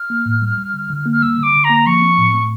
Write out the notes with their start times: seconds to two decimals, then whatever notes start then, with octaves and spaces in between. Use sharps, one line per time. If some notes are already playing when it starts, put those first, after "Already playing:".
Already playing: F6
0.10 A#3
0.26 A2
0.42 G3
0.58 G3
0.74 D3
0.90 D3
1.06 A#3
1.11 F6
1.22 G3 E6
1.38 D3
1.43 D6
1.53 D3
1.64 A#5
1.70 A#3
1.86 F3 C#6
2.02 C4
2.18 A2
2.33 A3